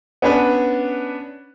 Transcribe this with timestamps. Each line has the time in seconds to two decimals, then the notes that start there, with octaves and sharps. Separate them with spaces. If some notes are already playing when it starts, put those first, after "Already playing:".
0.22 B3 C#4 D4 B4